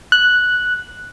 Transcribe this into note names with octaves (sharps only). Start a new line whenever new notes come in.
F#6